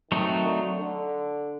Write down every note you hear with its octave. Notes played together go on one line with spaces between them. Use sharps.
D#3 F#3 A3 C4 D#4
D3
D3